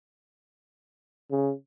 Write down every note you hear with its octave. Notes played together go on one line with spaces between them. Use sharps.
C#3